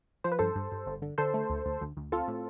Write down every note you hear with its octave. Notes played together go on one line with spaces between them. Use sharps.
F3 C5
B4
G2 A4 C5
G2
G2
G1
D3
D3 A4 C5
A3
D2
D2
D2
D2
C4 F4 A4
A2